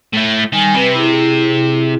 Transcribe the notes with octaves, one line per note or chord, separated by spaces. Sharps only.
A2 A3
D#3 G3 G#5
C3 B4 B5
E4 G#4